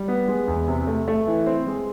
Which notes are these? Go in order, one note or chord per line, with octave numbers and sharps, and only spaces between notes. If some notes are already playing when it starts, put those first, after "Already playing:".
Already playing: G3
B3
G#3
E2
C3
A3
A3
E3
C4
G#3